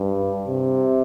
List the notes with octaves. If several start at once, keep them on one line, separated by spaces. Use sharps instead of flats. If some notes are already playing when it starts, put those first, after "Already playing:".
Already playing: G2
C3